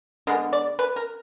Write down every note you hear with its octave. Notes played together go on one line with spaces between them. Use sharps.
D3 G#3 B3 A#4
D5
B4
A#4